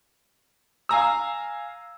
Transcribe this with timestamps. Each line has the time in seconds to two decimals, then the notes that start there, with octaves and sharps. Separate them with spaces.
0.89 F5 G#5 A#5 E6